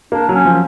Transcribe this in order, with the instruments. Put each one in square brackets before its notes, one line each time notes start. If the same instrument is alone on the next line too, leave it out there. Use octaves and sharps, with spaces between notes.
[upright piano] A#3 [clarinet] D4
[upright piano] F#3
[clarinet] C#4
[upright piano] F3